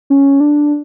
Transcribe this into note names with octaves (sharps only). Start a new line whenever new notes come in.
C#4
D4